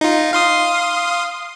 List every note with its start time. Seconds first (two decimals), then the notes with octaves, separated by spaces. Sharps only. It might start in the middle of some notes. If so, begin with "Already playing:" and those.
0.01 D#4 F4
0.33 F5 C6 D#6